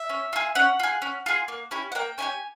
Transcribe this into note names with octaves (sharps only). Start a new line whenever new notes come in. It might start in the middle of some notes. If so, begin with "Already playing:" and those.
Already playing: E5
C#4
F4 G#4
C#4 F#5
F4 G#4
C#4
F4 G#4
A#3
C#4 E4 G4
F#5
A#3 G5
C#4 E4 G4 G#5